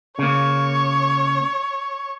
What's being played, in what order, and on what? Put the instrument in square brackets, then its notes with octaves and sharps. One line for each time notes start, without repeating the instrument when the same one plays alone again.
[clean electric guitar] C#3 A#3 [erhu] C#5